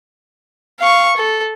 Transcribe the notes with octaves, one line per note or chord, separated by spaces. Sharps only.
F5 C#6
A4